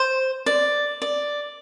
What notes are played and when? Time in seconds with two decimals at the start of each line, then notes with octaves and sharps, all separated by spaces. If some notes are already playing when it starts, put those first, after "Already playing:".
Already playing: C5
0.46 D5
1.02 D5